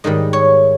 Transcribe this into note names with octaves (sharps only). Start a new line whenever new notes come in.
G#2 D#3 G3 D#5
C#5